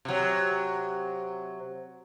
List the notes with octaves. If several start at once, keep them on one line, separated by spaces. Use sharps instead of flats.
C3 F#3